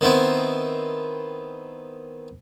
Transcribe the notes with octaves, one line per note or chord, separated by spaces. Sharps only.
D#3 B3 C4 E4